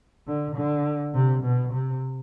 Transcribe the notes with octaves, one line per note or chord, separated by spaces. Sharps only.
D3
D3
C3
B2
C3